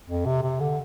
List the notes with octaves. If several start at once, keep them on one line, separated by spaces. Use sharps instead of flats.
F2
C3
C3
D3